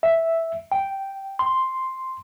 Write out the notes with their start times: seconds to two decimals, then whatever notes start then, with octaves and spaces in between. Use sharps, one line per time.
0.03 E5
0.72 G5
1.39 C6